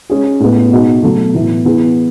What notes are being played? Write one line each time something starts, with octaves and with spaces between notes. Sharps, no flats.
G#3 C#4 G#4
A2 G#3 B3
B2 G#3 D#4 F#4
B2 F#3 A3
A2 E3 B3 E4
E3 B3 E4 G#4